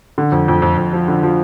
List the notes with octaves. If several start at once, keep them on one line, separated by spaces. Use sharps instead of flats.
D3
F2
F2
F2
F2
F3
D3
F3